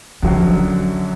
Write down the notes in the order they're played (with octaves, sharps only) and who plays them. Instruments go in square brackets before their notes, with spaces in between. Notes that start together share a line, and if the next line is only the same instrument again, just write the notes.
[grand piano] F#2 D3 F#3 [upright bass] F3